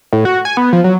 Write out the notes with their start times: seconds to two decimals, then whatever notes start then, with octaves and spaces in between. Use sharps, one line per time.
0.13 A2
0.25 F#4
0.45 G#5
0.57 B3
0.73 F3
0.84 F#3